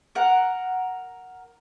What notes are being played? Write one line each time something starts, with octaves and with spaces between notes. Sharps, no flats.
A#4 F#5